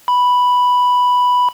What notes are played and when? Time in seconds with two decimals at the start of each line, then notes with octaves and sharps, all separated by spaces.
0.08 B5